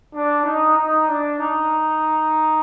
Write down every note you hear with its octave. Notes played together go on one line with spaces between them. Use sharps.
D4
D#4
D#4
D4
D#4